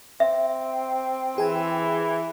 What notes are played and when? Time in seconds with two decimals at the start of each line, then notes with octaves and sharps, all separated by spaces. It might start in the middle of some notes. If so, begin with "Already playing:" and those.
0.20 C4 E5
1.38 E3 G#4 G#5